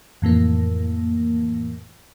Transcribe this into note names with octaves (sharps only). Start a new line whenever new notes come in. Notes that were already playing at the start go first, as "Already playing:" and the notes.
F2 A2 E3 A#3